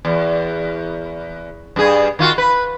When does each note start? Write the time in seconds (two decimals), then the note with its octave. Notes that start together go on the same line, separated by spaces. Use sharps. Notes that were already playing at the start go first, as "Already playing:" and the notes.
0.05 E2
1.76 G2 G#4
2.19 D#3 F4 F#4
2.38 B4